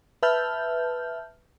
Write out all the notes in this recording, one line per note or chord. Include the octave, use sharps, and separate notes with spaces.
B4 E5 A5 F6 G6